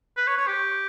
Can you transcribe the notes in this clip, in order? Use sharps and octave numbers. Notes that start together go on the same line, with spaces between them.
B4
C#5
C#5
G4